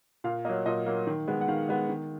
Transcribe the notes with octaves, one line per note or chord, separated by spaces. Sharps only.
A#2 F5
F#3 A#3 D#5
A#2 D#5
F#3 A#3
D#3
G#3 B3
F#5
D#3 F5
G#3 B3
D#3